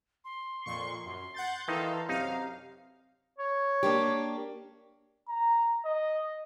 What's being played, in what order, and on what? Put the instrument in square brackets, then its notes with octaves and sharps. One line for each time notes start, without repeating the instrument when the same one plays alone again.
[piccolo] C6
[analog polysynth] F2 A#2 C#6
[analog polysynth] F#2 [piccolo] C6
[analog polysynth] F#5 G6 A6
[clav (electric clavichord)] D#3 D#4 [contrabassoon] E3 [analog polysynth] A4 F5
[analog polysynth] F#2 F5 [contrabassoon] C3 [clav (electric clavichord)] D#4
[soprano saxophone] C#5
[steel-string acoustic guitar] A#3 D4 G4
[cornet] A#5
D#5